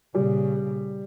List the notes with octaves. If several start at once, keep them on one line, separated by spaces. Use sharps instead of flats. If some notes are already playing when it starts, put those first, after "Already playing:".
A#2 C#3 G3